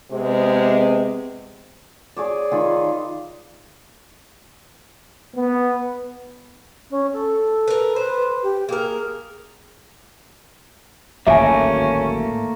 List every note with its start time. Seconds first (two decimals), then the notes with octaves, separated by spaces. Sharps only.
0.11 C3 G#3 B3 C4
2.17 G#4 C#5 D5
2.51 D#3 F4 G#4 B5
5.36 B3
6.91 C#4
7.13 A4
7.68 A#4 B4
7.96 B4 C5
8.43 G4
8.69 A#3 G#4 A#4
11.27 D1 G#1 D#3 A3 A#3 C#4 E5 G#5